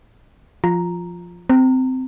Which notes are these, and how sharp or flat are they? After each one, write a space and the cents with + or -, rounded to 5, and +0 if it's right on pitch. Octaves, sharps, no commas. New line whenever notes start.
F3 +0 F4 +5 A#5 +0
C4 -15 A#5 -25